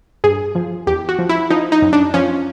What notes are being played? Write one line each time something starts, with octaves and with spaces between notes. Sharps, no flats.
G2 G#4
F3
E2 G4
F#4
F3
E4
F3 D#4
D#4
F#2
D4
F3 C#4